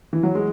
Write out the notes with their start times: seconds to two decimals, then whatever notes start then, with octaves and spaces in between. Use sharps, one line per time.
0.13 E3
0.23 F#3
0.35 G#3